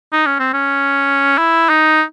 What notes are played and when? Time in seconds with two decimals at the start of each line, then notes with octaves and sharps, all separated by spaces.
0.13 D#4
0.26 C#4
0.39 C4
0.53 C#4
1.38 E4
1.69 D#4